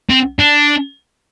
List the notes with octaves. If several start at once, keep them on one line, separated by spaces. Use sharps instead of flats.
C4
D4